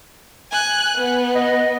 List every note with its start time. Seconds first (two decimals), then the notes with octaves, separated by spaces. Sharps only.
0.51 G#5 F#6
0.98 B3
1.35 D#5